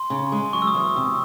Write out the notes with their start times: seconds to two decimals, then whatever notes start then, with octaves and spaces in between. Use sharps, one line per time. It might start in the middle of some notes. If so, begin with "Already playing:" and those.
Already playing: C6
0.10 C#3
0.32 G#3
0.53 F#3 C#6
0.62 E6
0.67 D#6
0.74 E2
0.82 E6
0.96 C3 D#6